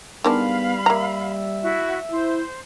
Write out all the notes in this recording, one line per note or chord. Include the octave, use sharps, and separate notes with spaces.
D#3 G3 G#3 B3 D4 F5 B5
A#3 E5 A#5
E4 F#4
E4 C5